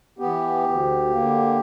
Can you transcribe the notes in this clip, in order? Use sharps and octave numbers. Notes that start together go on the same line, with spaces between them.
E3 B3 G4
D2
D3 A#3